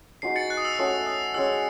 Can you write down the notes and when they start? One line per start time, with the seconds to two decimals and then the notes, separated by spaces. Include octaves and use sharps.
0.22 G#3 D#4 F#4 C5 C7
0.36 A6 C#7
0.50 F#6
0.57 D#6
0.65 E6
0.78 A3 C#4 F#4 C#5 D#6
1.06 D#6
1.34 G#3 C#4 G#4 D#5 E6